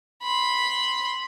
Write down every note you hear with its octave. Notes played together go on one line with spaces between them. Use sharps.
B5 C6